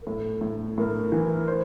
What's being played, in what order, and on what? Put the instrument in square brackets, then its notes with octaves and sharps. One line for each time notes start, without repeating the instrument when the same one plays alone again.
[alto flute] A#4
[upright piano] A2 [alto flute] A4
[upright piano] A2
[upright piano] A2 [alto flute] A#4
[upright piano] E3
C5